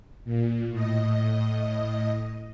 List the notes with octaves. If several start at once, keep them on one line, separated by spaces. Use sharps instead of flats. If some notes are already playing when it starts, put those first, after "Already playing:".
A#2
A2 D#5